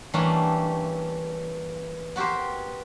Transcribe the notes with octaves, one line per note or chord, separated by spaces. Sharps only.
E3 G3 A3 A#3 C#4 D4
B3 F#4 G4 A#4 C5